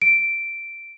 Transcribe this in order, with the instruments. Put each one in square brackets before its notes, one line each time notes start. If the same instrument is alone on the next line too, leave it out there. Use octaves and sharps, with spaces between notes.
[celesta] D7